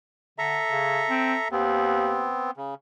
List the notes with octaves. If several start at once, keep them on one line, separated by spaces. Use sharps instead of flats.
D3 A4 E5 A#5
C#3
C4
D#2 B3 C4
C#3